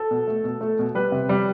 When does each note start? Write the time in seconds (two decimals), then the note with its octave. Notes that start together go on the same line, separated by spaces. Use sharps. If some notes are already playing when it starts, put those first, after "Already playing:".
Already playing: A4
0.11 B2
0.28 A3
0.44 B2
0.61 A3
0.79 B2
0.95 G3 B4
1.12 C3
1.29 G3